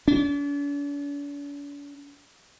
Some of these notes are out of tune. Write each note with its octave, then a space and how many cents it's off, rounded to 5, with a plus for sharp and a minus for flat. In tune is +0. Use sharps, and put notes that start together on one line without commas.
D4 -45